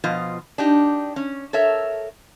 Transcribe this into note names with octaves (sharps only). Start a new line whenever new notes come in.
B2 F3 F4 D#5
D4 D#4 G4
C#4
A4 A#4 C#5 E5